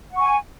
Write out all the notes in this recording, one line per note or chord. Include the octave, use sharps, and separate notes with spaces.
F#5 G#5 C#6